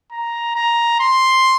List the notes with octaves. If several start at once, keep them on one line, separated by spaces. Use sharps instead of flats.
A#5
A#5
C6